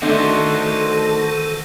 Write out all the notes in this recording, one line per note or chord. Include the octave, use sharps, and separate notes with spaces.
D#3 A3 D4 D#4 F#4 A4 C5 A5